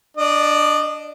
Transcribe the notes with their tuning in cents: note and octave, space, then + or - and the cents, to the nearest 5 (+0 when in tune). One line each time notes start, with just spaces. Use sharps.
D4 +0 D#5 -25